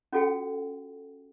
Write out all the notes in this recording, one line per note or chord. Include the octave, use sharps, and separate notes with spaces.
C#4 F4 F#4 A4 F#5 G5